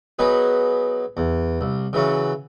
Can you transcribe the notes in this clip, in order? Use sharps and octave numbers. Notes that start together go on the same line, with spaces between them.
F#3 B3 D#4 G#4 B4
E2
C2
C#3 E3 F#3 C#4